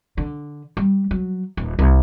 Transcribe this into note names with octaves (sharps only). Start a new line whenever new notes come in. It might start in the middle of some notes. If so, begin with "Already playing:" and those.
D3
G3
F#3
D#1
C2